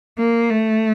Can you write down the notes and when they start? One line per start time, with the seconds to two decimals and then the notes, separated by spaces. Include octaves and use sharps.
0.18 A#3
0.50 A3